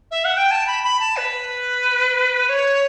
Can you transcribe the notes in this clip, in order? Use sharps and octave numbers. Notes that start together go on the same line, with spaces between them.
E5
F#5
G5
A5
B5
B5
A5
B4
C#5